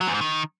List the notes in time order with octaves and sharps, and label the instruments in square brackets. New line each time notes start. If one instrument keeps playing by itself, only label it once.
[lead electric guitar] F#3
E2
G#2
D#3